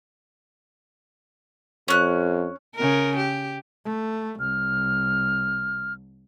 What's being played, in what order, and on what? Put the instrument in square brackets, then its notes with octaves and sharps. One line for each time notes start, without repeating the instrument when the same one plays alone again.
[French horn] F2 [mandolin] C#4 F#6
[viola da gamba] C#3 A#4
G4
[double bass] A3
[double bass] C2 [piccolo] F6